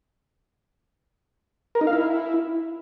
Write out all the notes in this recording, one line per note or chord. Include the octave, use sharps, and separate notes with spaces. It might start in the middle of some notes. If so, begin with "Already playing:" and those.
A#4
D#4
F5
E4